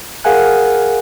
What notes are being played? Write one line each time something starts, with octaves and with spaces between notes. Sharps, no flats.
G#4 A#4 F5 F#5 G#5 F#6